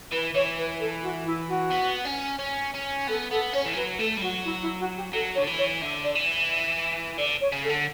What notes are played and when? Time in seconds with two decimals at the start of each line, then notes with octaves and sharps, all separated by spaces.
0.11 E3 B4
0.34 E3 C#5
0.57 B4
0.79 A4
1.02 F#4
1.25 E4
1.48 F#4
1.70 B3
2.05 C#4
2.39 C#4
2.74 C#4
3.07 B3 A4
3.30 B3 A4
3.53 C#4 C#5
3.65 E3
3.76 F#3 B4
3.99 A3 A4
4.17 G3
4.21 F#3 F#4
4.44 E4
4.61 E4
4.79 F#4
4.96 G4
5.13 F#3 A4
5.35 C#5
5.38 D3
5.47 E3
5.58 C#5
5.81 D3 E5
6.04 D5
6.15 E3
6.50 E5
7.18 D3 D5
7.41 C#5
7.52 C#3
7.63 A4
7.69 D3